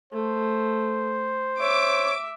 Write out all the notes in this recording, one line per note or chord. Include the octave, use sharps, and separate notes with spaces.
A3 C5
C#5 E5 D6